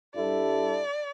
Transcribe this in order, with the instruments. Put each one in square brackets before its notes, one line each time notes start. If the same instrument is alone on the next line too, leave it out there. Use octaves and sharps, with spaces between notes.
[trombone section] G2 G3 E4 A4 [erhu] D5